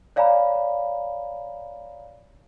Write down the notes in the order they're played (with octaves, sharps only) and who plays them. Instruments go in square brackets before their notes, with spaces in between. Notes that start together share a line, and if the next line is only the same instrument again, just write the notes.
[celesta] C#5 D5 F5 G#5 A#5 B5